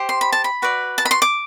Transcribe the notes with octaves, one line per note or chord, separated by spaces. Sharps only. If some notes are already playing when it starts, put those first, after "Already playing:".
Already playing: G4 C5
C6
B5
A5
B5
F#4 B4 D5
A5
B5
C6
D6